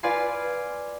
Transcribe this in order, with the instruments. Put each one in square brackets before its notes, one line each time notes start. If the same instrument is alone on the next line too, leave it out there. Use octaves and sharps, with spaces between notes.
[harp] F4 B4 D5 F5 G#5 C6